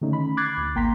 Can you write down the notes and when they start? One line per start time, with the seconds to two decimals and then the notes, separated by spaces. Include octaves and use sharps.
0.01 D3 D#3 A3 C#4 D#4
0.13 B5
0.37 B5 D6 F#6 G#6 A6 C7
0.57 D2
0.75 G#1 A#3 G5 A#5 C6 B6